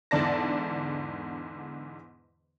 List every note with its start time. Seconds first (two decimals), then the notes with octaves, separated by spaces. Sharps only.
0.11 E2 G#2 D3 D5 A5 A#6